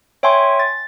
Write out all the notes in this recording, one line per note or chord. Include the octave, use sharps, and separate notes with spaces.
C#5 E5 G5 G#5 C6 C#6
A6